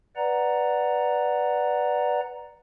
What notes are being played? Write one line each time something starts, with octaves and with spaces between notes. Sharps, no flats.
B4 D5 F#5 A#5